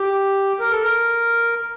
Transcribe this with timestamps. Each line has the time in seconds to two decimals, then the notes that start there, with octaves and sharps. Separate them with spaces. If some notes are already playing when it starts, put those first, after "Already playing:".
Already playing: G4
0.60 A#4
0.71 A4
0.82 A#4